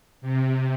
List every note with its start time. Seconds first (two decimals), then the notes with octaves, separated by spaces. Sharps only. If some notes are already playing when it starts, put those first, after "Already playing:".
0.21 C3